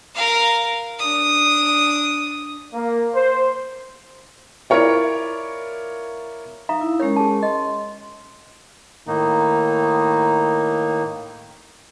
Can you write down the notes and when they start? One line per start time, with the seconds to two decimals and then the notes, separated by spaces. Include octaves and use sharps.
0.15 A#4 F5
0.99 D4 D#6
2.73 A#3
3.14 C5
4.70 E4 F4 A#4 C#5 D5
6.69 D#4 E5 F5 A#5
6.81 E4
7.00 G#3 C#4 A#4 C#5
7.16 G#4 A5
7.43 D#5 C6
9.07 A2 D#3 A#3 D#4